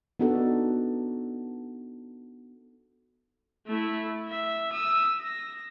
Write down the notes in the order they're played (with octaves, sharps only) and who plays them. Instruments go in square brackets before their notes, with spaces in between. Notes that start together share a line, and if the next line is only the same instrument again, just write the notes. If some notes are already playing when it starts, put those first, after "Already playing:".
[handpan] B3 D4 D#4 F#4 A4
[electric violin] A3 E4
E5
D#6 E6
A#6